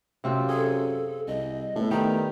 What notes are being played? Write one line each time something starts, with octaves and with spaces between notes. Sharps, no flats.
F#2 C3 C4 F4
G#4 A4
C2 D#5
A2 A3 B3
D#3 G3 G5 A#5